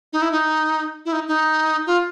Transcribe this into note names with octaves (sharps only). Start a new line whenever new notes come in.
D#4
E4
D#4
E4
D#4
D#4
F4